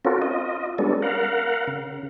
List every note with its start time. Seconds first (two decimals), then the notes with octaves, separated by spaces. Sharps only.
0.05 C4 C#4 F4 F#4 A4 A#4
0.22 F4 D#5
0.78 G3 G#3 B3 C#4 D4 A4
1.02 A#4 F5 F#5
1.67 C#3